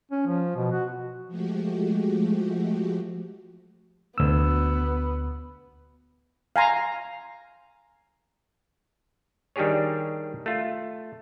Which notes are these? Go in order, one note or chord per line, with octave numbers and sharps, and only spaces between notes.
C#4
F3
B2
F#4
F3 G#3 A3 F#4 G4
D2 B3 E6
F5 G#5 A#5 C6
D#3 G3 D4 G4 G#4 C#5
A3 F4